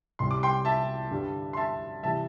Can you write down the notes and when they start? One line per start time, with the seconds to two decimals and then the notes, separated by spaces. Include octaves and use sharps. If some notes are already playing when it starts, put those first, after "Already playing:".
0.19 C2 C3 G3 C6
0.31 D6
0.43 G5 C6
0.65 E5 A5
1.11 G2 D3 G3
1.53 C6
1.57 E5 A5
2.03 C3 E3 G3 E5 A5